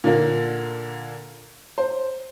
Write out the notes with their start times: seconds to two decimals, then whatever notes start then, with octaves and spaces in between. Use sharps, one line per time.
0.04 A#2 D3 A#3
1.78 C5